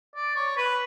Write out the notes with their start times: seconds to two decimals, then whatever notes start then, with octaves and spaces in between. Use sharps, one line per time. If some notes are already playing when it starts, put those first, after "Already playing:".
0.15 D5
0.36 C#5
0.57 B4